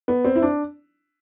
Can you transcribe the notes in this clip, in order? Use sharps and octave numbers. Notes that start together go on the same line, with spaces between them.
B3
C4
E4
D4